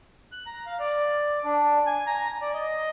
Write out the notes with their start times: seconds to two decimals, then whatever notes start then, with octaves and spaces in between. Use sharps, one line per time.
0.32 F#6
0.46 A#5
0.66 F5
0.79 D5
1.44 D4
1.86 G#5
2.07 A#5
2.25 A#5
2.41 D5
2.54 D#5